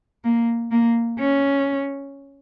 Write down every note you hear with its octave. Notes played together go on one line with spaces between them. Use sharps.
A#3
A#3
C#4